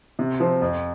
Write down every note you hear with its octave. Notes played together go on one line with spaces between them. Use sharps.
C3
F3 C4
F2